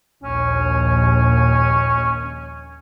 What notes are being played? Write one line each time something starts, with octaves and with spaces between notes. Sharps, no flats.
A#1 D#2 C#4